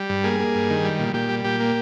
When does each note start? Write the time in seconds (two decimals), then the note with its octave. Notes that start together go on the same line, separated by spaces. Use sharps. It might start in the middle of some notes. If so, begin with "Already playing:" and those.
Already playing: G3
0.09 G2
0.24 A#3 G#4
0.40 A#3
0.55 G2
0.70 D#3
0.85 G3
0.99 A#2
1.14 A#2 G4
1.29 G3
1.45 A#2 G4
1.60 A#3